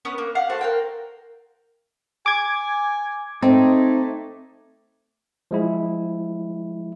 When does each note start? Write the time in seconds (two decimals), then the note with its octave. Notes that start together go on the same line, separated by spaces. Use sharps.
0.05 B3 C#4 B4
0.18 A#3
0.35 G4 F5 F#5
0.50 A3 F#4 C5 F#5
0.61 A#4 F5 G5
2.26 G#5 D6 G#6
3.42 A3 C4 D#4
5.51 F3 G#3 E4